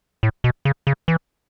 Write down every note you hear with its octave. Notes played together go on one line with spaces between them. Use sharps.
A2
B2
C#3
C#3
E3